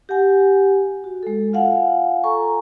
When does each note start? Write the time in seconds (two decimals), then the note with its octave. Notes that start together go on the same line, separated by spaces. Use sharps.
0.09 G4 F#5 G#5
1.04 F#4
1.23 G#3 A4
1.53 F4 F5 F#5 G#5
2.24 F4 A4 G#5 A#5 C#6